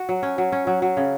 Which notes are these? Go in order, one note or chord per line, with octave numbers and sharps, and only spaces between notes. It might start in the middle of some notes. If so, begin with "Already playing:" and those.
Already playing: F#4
F#3
C#4
F#3
C#4
F#3
F#3
C#3